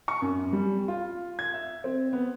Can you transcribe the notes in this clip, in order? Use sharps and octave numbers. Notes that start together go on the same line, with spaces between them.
C#6
F#2
G3
F4
G#6
E5
C4
B3